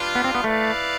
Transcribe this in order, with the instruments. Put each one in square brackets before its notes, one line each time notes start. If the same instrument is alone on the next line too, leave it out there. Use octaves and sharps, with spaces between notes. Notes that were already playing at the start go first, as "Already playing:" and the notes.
Already playing: [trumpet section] G3 D4 F4 B4
[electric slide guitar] B3
C4
B3
[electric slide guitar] A3 [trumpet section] E4 B4 D5 F5